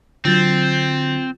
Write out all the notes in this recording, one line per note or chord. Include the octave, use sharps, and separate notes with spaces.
D3 F#3 C4 F4 G6 A6